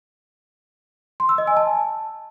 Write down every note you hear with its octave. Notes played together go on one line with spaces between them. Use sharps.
C6
E6
D#5
G#5
A5